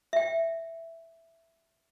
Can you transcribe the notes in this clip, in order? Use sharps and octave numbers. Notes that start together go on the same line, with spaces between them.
E5 G5